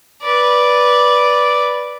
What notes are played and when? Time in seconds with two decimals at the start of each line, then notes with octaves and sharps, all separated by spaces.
0.22 B4 D5